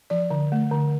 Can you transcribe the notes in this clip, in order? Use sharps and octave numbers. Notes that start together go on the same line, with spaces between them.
F3 D5
D3
A3
D3